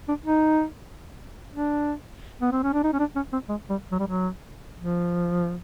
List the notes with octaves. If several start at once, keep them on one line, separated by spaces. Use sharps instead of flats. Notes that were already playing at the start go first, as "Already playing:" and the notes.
D4
D#4
D4
B3
C4
C#4
D4
D#4
C#4
D4
C#4
C4
G#3
G3
F#3
G3
F#3
F3